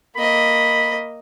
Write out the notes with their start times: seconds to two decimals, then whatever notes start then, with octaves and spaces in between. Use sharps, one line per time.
0.16 A#3 D#5 B5